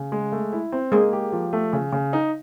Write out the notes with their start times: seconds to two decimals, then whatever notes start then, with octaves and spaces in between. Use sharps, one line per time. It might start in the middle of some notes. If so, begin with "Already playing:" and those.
Already playing: C#3
0.12 G#3
0.32 A3
0.53 E4
0.72 C4
0.92 G#3 A#3 G#4
1.13 G4
1.32 F3
1.53 A3
1.73 C#3
1.93 C#3
2.13 D#4